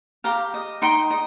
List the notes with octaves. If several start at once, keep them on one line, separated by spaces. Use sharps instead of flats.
G4 F5 A#5
D#5
D#4 G5 C6
D#5